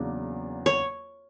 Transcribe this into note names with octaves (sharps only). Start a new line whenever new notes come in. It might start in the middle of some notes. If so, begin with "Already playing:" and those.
Already playing: E2 C#3 F#3 A#3 D4
C#5